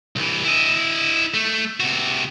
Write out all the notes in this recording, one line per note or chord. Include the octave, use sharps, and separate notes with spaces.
C2 E3
E4 D#5
A3
C3 F#4